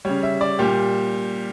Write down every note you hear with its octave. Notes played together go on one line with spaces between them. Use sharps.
C#3 G3 C#5
E5
D5
A#2 G3 G4